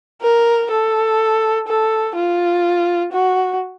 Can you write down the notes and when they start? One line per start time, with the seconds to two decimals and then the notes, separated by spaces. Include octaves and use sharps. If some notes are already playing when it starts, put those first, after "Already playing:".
0.22 A#4
0.71 A4
1.67 A4
2.16 F4
3.12 F#4